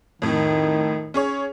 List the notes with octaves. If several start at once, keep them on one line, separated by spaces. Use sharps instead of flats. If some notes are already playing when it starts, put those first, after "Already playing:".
F2 A2 D#3
C#4 G#4 C#5